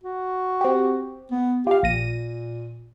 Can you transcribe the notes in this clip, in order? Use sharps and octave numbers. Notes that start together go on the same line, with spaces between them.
F#4
C4 G4
B3
F4 G4 F5
A#1 A#2 A#6 D#7